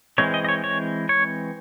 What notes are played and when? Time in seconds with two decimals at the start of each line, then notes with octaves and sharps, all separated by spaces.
0.18 E3 G#3 C4 C#5
0.34 D#5
0.45 D#5
0.49 C#5
0.64 C#5
1.09 C#5